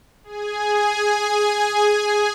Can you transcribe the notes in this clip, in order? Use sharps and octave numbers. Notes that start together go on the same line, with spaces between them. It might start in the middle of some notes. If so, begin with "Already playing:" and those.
G#4 G#5